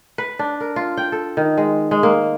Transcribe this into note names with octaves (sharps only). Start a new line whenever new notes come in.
B4
D4
A#4
F4
G5
A4
D#3
G#3
G#3
A#3